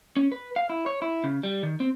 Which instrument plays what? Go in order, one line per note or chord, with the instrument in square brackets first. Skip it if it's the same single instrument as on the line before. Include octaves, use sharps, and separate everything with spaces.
[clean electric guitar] C#4
B4
F5
E4
C#5
E4
C#3
G3
D#3
C4